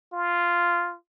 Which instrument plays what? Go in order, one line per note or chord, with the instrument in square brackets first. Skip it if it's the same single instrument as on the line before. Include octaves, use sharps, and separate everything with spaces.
[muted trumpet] F4